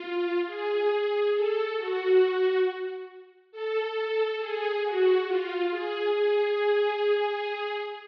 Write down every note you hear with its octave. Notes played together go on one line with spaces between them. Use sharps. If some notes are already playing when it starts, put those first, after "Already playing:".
Already playing: F4
G#4
A4
F#4
A4
A4
G#4
F#4
F4
G#4
G#4